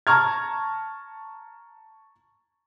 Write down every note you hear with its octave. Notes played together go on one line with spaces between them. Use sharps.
A5 A#5 C#6 F6 G#6